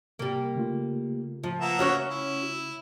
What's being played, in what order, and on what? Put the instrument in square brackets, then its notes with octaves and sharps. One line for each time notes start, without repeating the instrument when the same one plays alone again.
[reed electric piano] C3 [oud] G3 A#3
[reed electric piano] C#3 A3 F4
[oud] F3
[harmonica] A#3 B3 E5
[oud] C#4 F#4 C#5
[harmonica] E4